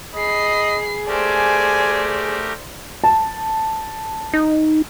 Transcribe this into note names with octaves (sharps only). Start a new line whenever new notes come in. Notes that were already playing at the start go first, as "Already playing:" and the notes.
G#4 D#5 B5 C7
A3 G4 A#4 C5 D5 G#5
A5
D#4